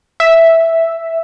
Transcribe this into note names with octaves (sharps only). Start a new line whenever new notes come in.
E5